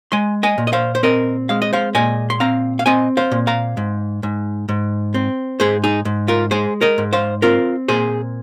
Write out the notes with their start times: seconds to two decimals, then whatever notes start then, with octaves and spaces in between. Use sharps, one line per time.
0.12 G#3 G#5 C6
0.43 D#5 G#5
0.58 A#2
0.67 D#5
0.73 C5 F5
0.95 C5
1.03 C4 A#4 D#5
1.49 G#3 F5
1.62 D#5
1.73 C5 F5
1.95 A#2 D#5 G#5
2.30 C6
2.40 C4 F5 A#5
2.79 F5
2.86 C4 D#5 G#5
3.17 C5 F5
3.32 A#2
3.47 F5 A#5
3.77 G#2
4.23 G#2
4.69 G#2
5.14 C4
5.60 G#2 G#4 C5
5.84 D#4 G#4
6.05 G#2
6.28 F4 A#4
6.51 G#3 G#4 C5
6.81 A#4 D#5
6.98 G#2
7.13 C5 F5
7.42 C4 F4 A#4
7.88 A#2 G#4 C5